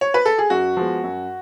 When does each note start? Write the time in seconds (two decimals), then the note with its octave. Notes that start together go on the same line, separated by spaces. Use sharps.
0.01 C#5
0.14 B4
0.26 A4
0.38 G#4
0.50 F#2 F#4
0.77 F3 G#3 B3
1.03 F#2